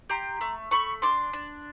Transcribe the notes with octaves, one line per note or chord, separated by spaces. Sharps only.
G4 A#5 C6
A3
A3 B5 C#6
D4 C6 D6
D4